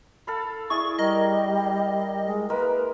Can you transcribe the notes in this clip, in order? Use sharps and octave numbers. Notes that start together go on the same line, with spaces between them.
A4 F5 B5
E4 G#4 D5 C#6
G3 A#4 D#5
G#3
G#3 A#3 A#4 B4